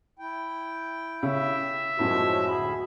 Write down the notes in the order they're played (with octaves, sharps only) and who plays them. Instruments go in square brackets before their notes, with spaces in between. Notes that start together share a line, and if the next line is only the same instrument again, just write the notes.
[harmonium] E4 G5
[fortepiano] C#3 [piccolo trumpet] E5
[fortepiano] F#2 A2 [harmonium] F3 G#3 C#4 [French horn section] F#4
[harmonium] D2 G#4 [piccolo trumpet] B5